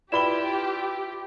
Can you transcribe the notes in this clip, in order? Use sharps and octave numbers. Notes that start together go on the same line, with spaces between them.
E4 F4 G4 B4 D5 B5 E7 G7